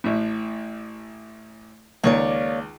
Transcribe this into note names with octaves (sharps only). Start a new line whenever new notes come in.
A1 A2
C#2 D#3 A#3 C#5 D5